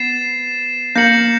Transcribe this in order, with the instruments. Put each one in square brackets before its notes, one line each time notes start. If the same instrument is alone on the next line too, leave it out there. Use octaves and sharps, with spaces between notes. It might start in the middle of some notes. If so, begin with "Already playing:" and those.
Already playing: [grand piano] B3 [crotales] A6 C7 E7
[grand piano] A#3 [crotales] G6 A#6 C#7 F#7